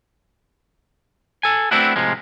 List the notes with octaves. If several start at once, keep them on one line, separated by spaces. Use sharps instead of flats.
A4 G#5
A3 B3 C4 D4 E4 F#4
A2 C3 F3 G#3